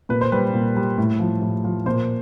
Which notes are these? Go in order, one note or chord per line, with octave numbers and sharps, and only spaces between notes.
A#2 B4
C5
G3 B4
A#2
G3
A2
F3
A2
F3
A#2 C5